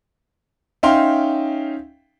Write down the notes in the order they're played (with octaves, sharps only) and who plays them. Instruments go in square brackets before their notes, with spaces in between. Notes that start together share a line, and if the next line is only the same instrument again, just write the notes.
[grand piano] C#4 D#4 E5 F5 G5 C6